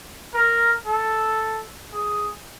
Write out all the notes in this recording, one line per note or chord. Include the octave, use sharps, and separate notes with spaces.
A#4
A4
G#4